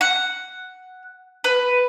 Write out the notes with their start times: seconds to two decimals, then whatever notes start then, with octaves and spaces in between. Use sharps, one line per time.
0.01 F#5
1.44 B4